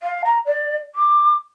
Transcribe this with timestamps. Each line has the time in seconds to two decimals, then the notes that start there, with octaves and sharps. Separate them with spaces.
0.02 F5
0.24 A#5
0.46 D5
0.95 D6